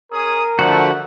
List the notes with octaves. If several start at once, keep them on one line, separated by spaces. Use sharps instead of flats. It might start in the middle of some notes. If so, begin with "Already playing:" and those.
C#4 G#4 A#4 D#6
D3 F3 A3 F#4 F#5